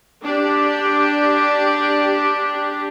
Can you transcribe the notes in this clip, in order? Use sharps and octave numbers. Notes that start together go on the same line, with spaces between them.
D4 G4